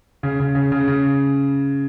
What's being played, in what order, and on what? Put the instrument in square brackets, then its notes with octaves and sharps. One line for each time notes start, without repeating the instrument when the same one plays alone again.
[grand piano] C#3
C#3
C#3
C#3
C#3